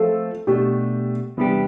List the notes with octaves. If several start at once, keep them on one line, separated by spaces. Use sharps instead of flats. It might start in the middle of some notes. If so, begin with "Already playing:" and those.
Already playing: F3 A3 C4 F4 A4
B2 A3 D4 G4
E2 C3 G3 B3 D4 G4